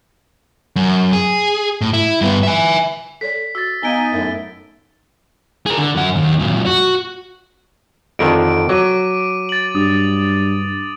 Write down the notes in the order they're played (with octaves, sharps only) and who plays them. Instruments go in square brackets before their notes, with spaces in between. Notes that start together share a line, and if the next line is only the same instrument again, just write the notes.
[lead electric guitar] F#2
G#4
A2
E4
G2 B3
E5 G#5
[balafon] A4 C#5 D5 [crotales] B6
[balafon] F#4 [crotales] E6 A6
[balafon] B3 F5 [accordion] D#4 G#5 [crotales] D7 G7
[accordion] F#2 A2 [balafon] D#4 A#4 E5
[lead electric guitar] G#4 A#4
D3
F#2 F#5
D#2
F#2 A#2
F#4
[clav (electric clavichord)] F2 D3 D#3 [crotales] D7
[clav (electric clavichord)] F#3 [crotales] D6 D#7
[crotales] A6 F#7
[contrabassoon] G2 [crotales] D#6